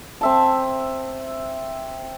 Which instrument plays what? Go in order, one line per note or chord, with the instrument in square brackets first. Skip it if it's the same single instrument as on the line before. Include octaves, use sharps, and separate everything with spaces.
[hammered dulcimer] C4 E5 A5